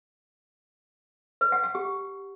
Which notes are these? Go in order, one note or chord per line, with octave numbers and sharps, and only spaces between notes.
B4
F#5
F#5
G4